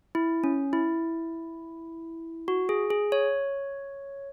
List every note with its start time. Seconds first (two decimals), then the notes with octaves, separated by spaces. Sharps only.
0.15 E4
0.44 C#4
0.73 E4
2.48 F#4
2.69 G#4
2.90 G#4
3.12 C#5